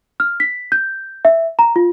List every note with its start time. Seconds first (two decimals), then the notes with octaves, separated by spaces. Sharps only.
0.20 F6
0.40 B6
0.72 G6
1.25 E5
1.59 A#5
1.76 F4